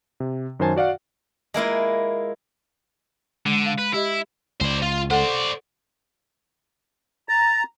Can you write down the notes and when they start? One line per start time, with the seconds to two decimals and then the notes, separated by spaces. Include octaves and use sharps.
0.20 C3
0.60 F#2 D#3 C5 G#5 A5
0.76 F#4 D5 F5 F#5
1.54 G#3 A#3 E4 F4
3.46 D3 G#3
3.66 F5
3.79 B4
3.94 E4 G4 D#5
4.61 C#2 C5 D5
4.83 F4
5.11 A4 C5 D5 F#5
7.29 A#5 A6